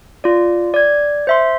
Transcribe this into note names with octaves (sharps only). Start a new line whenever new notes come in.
F4 D5
D5 G#6
C5 E5 C6